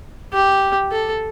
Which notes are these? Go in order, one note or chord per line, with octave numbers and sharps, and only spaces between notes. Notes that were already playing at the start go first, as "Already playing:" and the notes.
G4
A4